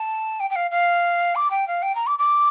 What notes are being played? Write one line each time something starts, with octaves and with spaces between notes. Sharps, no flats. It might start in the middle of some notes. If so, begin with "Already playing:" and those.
Already playing: A5
G5
G5
F5
F5
D6
G5
F5
G5
A#5
D6
D6